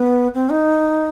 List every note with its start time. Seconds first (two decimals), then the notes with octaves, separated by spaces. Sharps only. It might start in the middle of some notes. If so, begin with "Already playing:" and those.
Already playing: B3
0.34 C4
0.50 D#4